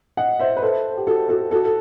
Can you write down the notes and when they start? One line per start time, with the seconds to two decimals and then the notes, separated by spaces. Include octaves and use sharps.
0.17 D#5 F#5
0.40 C5 E5
0.57 B4
0.62 A4 C5
0.97 G4
1.07 F#4 A4
1.29 F#4 A4
1.51 F#4 A4
1.65 A4